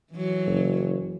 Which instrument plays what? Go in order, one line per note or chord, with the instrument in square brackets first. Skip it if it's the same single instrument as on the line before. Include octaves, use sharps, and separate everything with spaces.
[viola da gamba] E3 F#3
[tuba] F#1